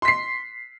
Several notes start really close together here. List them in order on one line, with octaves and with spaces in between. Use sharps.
C6 B6 C7